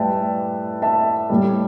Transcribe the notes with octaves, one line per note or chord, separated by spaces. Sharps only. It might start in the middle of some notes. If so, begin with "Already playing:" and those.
Already playing: A2 G3 B4 D5 E5 G5 A5
E5 A5
A2 G3